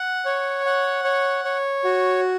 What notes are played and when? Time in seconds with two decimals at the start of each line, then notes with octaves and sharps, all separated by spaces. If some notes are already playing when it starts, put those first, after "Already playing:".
Already playing: F#5
0.26 C#5
0.66 F#5
1.04 C#5
1.44 C#5
1.84 F#4